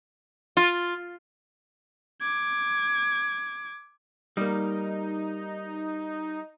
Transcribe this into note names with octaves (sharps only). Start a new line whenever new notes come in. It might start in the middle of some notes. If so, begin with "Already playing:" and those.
F4
D6 G#6
G3 A#3 D#4